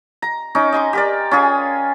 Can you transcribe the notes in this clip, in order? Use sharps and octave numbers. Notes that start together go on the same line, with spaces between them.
A#5
C#4 D#4 D6
D#5 G#5 C6 D6
G4 A#4 D5
C#4 F4 G#4 G#5